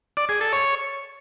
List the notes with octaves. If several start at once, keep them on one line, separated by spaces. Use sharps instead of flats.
D5
G#4
A4
C#5